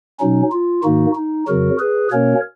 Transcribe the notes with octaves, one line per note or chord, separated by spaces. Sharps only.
B2 F#3 C#4 D#4
F4
G#2 D#3 A#3 D#4 F#4
D#4
F2 C#3 F#3 F#4 A#4
G#4 B4
B2 A#3 C#4 A#4 C#5